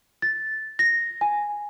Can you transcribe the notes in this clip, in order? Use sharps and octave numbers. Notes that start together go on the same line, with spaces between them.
A6
A#6
G#5